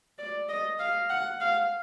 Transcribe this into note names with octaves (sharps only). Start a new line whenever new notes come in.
D5
D#5
F5
F#5
F5